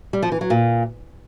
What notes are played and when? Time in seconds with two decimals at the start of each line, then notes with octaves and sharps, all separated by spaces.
0.13 G3
0.22 F3
0.32 E3
0.41 F#3
0.50 A#2